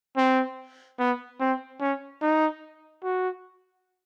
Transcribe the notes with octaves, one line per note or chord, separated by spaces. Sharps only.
C4
B3
C4
C#4
D#4
F#4